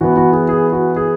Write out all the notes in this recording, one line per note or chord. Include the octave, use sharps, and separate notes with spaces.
E3 B3 F#4
F#4
G#4
G#4
F#4
G#4